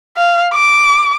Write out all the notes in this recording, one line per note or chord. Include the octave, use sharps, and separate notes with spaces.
F5
D6